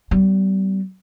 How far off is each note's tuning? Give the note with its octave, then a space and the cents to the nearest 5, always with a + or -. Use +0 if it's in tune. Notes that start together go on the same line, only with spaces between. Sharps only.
G3 -30 B3 +30